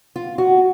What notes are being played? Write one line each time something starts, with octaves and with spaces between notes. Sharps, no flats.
F4
F#4